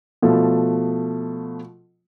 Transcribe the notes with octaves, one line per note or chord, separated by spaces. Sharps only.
B2 F3 A3